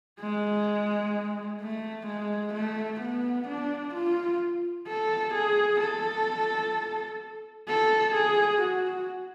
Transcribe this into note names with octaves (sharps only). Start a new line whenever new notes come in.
G#3
A3
G#3
A3
B3
D4
F4
A4
G#4
A4
A4
G#4
F#4